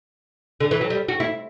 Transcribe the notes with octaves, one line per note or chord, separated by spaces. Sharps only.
D3
E3
F#3
G3
F#4
E4